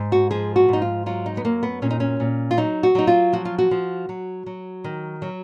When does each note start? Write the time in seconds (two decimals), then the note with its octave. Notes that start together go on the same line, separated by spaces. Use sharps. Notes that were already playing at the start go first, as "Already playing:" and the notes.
Already playing: G#2
0.12 F#4
0.31 F3 G#4
0.56 F#4
0.68 G#2 D#4
0.82 F4
1.06 F#3 F4
1.26 D#4
1.37 B3
1.44 F#2 A#3
1.63 B3
1.82 A#2 C#4
1.91 D#4
2.00 C#4
2.20 A#2
2.51 F4
2.57 F#3 D#4
2.83 F#4
2.95 F#3 D#4
3.07 F4
3.33 F3 F#4
3.45 F4
3.58 F#4
3.71 F3
4.09 F#3
4.46 F#3
4.84 D#3
5.22 F#3